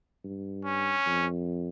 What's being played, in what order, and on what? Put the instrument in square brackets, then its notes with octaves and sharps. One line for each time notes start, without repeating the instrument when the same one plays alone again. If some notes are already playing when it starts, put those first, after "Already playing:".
[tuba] G2
[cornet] C#4
[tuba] F2